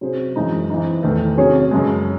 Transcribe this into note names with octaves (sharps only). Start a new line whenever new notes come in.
C3 F#3 C#4 G#4 C5
F#2 E3 G#3 D#4
E3 C4 D#4
E2 D#3 A3
C3 F#3 C#4 G#4 C#5
F#2 C#3 G#3